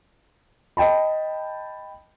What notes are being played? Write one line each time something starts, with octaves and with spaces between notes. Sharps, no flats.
D#5 G5 A5 B5